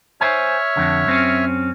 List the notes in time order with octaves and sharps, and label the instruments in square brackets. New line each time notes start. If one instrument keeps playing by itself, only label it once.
[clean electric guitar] C5 G#5 [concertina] C#5 E5 F6
[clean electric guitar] F2 D3
F#2 C4 C#4